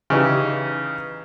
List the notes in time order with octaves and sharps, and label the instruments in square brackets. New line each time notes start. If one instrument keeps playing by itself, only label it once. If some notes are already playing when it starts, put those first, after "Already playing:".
[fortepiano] C#3 E3 D#4 G4